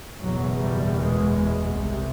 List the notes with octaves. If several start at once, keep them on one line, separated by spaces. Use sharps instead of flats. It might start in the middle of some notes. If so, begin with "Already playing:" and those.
F#1 E2 B2 F#3
G3
G#3
C2 C3